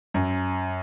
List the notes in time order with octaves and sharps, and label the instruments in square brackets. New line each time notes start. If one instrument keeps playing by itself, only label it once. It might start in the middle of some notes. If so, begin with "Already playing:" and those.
[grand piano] F#2